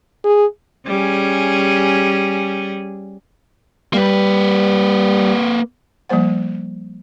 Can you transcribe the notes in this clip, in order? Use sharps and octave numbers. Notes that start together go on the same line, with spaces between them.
G#4
G3 C#4 G#4
G3 A#3 B4
F3 G3 A#3 C5 F#5